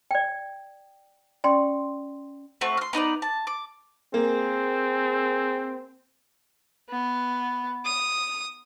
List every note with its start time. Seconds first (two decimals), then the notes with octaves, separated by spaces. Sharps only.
0.11 D5 G5
1.44 C#4 D5 G5 C6
2.61 A3 C4 F#4 C#6
2.77 C6 F6
2.93 B3 D#4 B4 D5
3.22 A5
3.47 D6
4.14 A#3 C4 G#4
6.89 B3
7.85 D#6